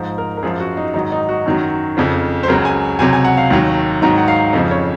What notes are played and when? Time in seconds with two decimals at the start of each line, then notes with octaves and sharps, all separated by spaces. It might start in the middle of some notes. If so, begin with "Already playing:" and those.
Already playing: G#2 F3
0.18 A#4
0.37 A#4
0.42 F#2 F3 G#4
0.60 F#4
0.77 D#4
0.94 G#2 D#3 F#3 D#4
1.12 D#4
1.29 F#4
1.46 F#2 D#3 F#3
1.97 F2 C#3 F3
2.43 C5
2.48 C#2 C#3 F#3 A#4
2.65 G#5
2.99 C#2 C3 F#3 G#5
3.13 G#5
3.25 F#5
3.37 F5
3.50 D#2 D#3 F#3
4.02 G#2 D#3 F#3 A#5
4.18 F#5
4.28 F5
4.53 F2 C#3 F3 D#5
4.71 C#5